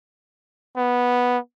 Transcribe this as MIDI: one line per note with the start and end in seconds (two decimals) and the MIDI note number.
0.77 1.38 59